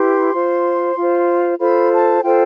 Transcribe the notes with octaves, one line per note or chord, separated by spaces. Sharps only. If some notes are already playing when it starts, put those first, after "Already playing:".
Already playing: E4 G4 B4 C6
F4 C5
F4 C5
F4 A4 C5 B5
A5
F4 A4 C5 G5